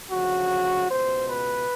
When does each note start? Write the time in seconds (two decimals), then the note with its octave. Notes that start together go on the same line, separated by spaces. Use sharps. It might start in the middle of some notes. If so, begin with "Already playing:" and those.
0.10 D2 C#3 F3 F#4
0.89 C#2 B2 C5
1.27 B4